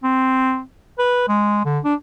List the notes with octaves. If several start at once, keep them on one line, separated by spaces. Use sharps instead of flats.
C4
B4
G#3
D3
D4